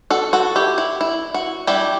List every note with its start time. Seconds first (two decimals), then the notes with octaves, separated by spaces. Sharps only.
0.10 F#4 A4
0.33 F#4 A4
0.56 E4 G4
0.78 E4
1.01 E4
1.34 F#4
1.67 G3 D4 E4 G4